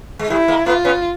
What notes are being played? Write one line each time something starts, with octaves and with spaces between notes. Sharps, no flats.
G#3
G3 A3 E4
G#3 A#3
A3 B3 F4
B3 C#4